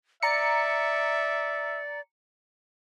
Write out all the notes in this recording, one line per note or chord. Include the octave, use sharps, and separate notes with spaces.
D5 E5 A#5 C#7